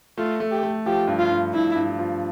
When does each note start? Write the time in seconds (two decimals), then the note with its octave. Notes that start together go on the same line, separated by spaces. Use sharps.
0.18 A3 F4
0.40 A3
0.51 G4
0.63 A3
0.86 F3 G4
1.08 G2
1.19 F4
1.30 G2
1.53 G2 E4
1.75 G2
1.99 F3